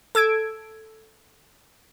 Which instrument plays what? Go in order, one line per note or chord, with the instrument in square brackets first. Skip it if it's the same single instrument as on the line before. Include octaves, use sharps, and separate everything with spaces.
[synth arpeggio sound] A4 E6 G#6 D7